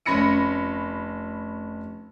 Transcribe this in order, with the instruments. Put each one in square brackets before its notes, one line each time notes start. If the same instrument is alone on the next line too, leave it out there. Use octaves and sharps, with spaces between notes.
[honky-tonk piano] F1 C#4 B5 A#6 C#7 D#7